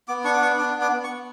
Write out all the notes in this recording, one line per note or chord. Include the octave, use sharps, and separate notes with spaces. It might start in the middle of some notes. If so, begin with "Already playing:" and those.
B3 D6
D4 C#6
D6
B3 C#6
D4 D6
B3
D6
B3
C#6
B3